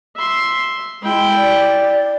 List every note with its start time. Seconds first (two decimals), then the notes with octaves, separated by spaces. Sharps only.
0.16 E5 C6
1.02 G#3 E4 G5
1.36 D5